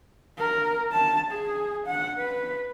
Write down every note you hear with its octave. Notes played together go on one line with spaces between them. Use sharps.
A#4
A5
G#4
F#5
B4